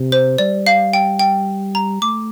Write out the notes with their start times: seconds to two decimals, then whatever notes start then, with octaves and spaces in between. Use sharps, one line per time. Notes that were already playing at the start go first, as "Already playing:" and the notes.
Already playing: C3
0.12 C5
0.38 G3 D5
0.66 F5
0.93 G5
1.19 G5
1.75 A#5
2.02 A3 D6